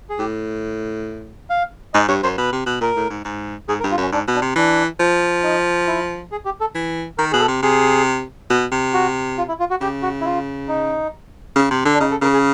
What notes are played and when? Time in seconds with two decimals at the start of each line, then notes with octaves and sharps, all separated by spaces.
0.10 G#4
0.18 A2 G4
1.50 F5
1.94 G#2 D#5
2.08 G2 C#5
2.23 F#2 C5
2.37 B2 B4
2.53 C3
2.66 B2
2.81 A#2 A#4
2.96 A2
3.10 G#2
3.25 G#2
3.68 G#2 G#4
3.80 A#4
3.84 G2
3.91 F4
3.98 F#2 C#4
4.12 G#2 D4
4.27 B2
4.35 D4
4.42 C3
4.56 E3 D4
5.00 F3
5.43 D#4
5.87 E4
6.32 G#4
6.45 G4
6.61 A4
6.75 E3
7.18 D#3 A#4
7.32 B2 G#4
7.40 A4
7.48 C3
7.62 C3 G#4
8.50 B2
8.72 C3
8.94 F#4
9.38 F4
9.48 E4
9.59 F4
9.70 F#4
9.81 C#3 G4
10.02 F#4
10.21 E4
10.25 F4
10.68 D#4
11.56 C#3
11.71 C3
11.85 D3
11.94 D4
12.00 C#3 D#4
12.11 A4
12.22 C#3 A#4
12.33 G#4